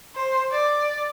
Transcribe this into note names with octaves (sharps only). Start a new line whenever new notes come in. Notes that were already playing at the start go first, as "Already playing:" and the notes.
C5
D5